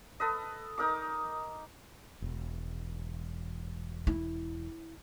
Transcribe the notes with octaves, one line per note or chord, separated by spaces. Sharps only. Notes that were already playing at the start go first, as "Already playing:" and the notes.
A4 B4 D#5
D#4 A#4 D#5 D6
E1
E4